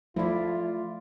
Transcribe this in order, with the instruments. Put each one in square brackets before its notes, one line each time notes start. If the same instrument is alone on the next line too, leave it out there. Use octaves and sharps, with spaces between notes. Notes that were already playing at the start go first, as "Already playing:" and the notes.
[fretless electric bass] F3 [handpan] A3 D5 [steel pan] E4 [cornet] F4